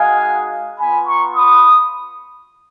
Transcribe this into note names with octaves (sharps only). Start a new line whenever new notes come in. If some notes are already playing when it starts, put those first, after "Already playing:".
Already playing: G#3 D#4 F#4 F5 G#5
B3 F4 G#5 B5
A#5 C#6
B5 D#6